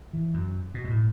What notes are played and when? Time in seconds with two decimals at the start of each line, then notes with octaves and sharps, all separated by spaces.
0.13 E3
0.34 F#2
0.74 B2
0.84 F#2
0.90 A2